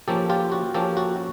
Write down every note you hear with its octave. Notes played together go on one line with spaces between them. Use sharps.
F3 A#3 C#4 G4 A4
F4 G4
F#4
F3 A#3 C#4 G4 A4
F#4